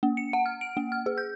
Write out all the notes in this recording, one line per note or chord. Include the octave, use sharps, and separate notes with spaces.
A#3
C#7
F#5
F6
D7
A#3
F6
G#4
G6